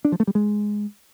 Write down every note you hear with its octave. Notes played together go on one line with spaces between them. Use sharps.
D4
F3
A3
G3
G#3